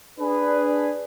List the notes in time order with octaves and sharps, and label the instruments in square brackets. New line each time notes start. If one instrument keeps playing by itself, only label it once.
[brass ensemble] D4 G#4 B4